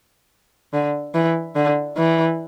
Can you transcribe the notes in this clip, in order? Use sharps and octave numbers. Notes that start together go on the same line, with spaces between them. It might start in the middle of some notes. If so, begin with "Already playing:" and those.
D3
E3
D3
E3